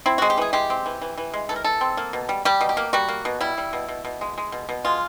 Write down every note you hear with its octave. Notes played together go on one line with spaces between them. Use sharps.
C4 E4
G#3 F#4
G4
E3 G#4
G#3 G4
C4
E3
E3
E3
G#3
E3 A4
A#4
E3 A4
C4
A#3
B2
G3
G3 G4
B2
G4
A#3
G3 F#4
A#3
B2
G3 E4
G3
B2
B2
B2
G#3
G#3
B2
B2
G#3 F4